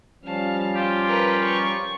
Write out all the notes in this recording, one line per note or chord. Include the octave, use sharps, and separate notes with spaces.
F3 G3 C#4 F5 A5
F4 G4
A#4 B4
C#6